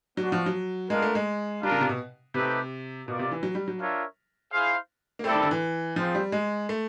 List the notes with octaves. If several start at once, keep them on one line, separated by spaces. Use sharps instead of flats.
F#3 B3 D4 F#4
F3
F#3
G#3 B3 D4 F4 A#4
A3
G#3
G3 D4 F4 A#4
C#3
C3
B2
C3 A3 C4 D#4 G4 B4
B2 F4 A#4 D5
C3
E3
F#3
G3
F#3
D4 F4 A#4 C#5 E5
E4 G#4 C5 F5
A#3
G3 A3 C4 E4 A4 D5
D#3
D3
E3
F3 C4 F4 G#4 C5
G3
G#3
A3